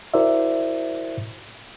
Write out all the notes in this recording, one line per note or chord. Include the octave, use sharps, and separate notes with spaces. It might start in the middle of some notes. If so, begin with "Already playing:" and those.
E4 F#4 A#4 C5 D5 E5